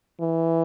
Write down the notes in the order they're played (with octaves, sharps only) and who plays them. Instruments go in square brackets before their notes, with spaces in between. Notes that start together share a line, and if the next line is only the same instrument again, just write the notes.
[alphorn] E3